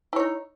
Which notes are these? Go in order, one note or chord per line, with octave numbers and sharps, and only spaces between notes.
D#4 E4 C#5